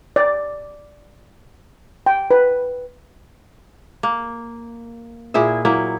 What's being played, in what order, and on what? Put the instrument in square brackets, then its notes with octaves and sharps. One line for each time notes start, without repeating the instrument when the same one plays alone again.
[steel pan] D5
G5
B4
[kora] A#3
A#2 E4 G#4 E5
F#3 A#3 E4